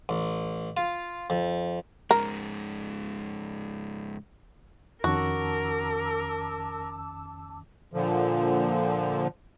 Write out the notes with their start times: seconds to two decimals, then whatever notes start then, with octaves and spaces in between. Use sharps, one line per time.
0.09 A1
0.77 F4
1.30 F2
2.11 G#2 C#3 G#3 A#4
5.04 F2 D#3 C#4 F#4 A#4 A5 D6 E6
7.94 A#2 D3 F3